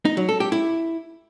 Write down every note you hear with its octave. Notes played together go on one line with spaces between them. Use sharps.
D#4
F#3
A4
G4
E4